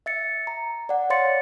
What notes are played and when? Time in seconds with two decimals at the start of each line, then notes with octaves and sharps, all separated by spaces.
0.06 E5 A6 C#7
0.47 A#5
0.89 D5 F#5
1.10 C#5 F5 C6 A6 C#7